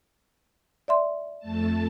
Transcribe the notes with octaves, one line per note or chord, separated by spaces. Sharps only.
D5 E5 C6
F2 A3 A5